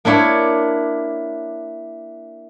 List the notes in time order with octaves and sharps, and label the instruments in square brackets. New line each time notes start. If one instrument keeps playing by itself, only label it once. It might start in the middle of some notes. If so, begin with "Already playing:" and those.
[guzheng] A#3 D4 E4 C#5